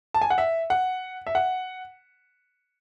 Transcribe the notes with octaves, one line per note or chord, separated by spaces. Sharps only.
A5
G#5
F#5
E5
F#5
E5
F#5